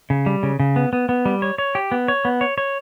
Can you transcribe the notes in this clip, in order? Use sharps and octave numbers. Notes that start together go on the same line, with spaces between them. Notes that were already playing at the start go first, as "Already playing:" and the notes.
C#3
G3
C#3
C#3
B3
B3
B3
G3
C#5
C#5
G4
B3
C#5
B3
C#5
C#5